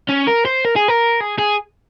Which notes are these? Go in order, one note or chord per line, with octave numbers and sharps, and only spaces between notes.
C#4
A#4
C5
A#4
G#4
A#4
G#4
G#4